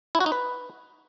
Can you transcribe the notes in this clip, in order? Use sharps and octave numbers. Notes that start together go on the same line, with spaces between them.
E4
F#4
D#4
B4